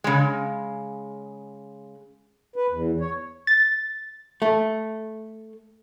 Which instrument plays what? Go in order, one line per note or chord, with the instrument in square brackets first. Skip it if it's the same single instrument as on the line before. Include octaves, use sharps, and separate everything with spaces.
[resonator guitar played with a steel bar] C#3 G#3
[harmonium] B4
E2
C#5
[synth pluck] A6
[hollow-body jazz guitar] A3